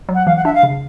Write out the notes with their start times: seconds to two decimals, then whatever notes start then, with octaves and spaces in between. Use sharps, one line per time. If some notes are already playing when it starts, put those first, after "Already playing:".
0.09 F#3
0.15 F#5
0.26 E3 F5
0.36 F#5
0.45 D4 E5
0.54 F5
0.63 C#3